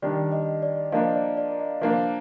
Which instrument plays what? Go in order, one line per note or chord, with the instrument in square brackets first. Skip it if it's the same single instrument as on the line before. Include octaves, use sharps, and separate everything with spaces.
[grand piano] D#3 G3 D4 [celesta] D5
[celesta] D#5
D5
[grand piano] F3 A#3 D4 [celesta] D#5
[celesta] D5
D5
D#5
[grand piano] F3 A#3 D4 [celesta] F5